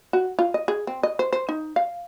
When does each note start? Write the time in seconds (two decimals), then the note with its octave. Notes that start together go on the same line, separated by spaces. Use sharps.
0.13 F#4
0.39 F4
0.54 D#5
0.68 G#4
0.87 C4
1.03 D#5
1.19 C5
1.33 C5
1.49 D#4
1.76 F5